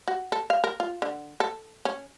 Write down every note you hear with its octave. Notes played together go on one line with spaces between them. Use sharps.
F#4
A4
F5
A#4
F4
D3
A4
C#4